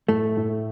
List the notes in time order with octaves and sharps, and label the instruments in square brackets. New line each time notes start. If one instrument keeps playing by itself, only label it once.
[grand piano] A2 [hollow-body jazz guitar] A3
[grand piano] A2